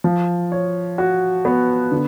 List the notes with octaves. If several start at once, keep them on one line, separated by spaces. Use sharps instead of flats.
F3
C#5
F#4
B3
D3